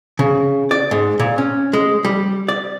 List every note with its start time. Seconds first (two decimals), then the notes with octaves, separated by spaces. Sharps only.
0.19 C#3
0.71 D5
0.91 G#2
1.19 A#2
1.38 C#4
1.73 G#3
2.05 G3
2.48 D5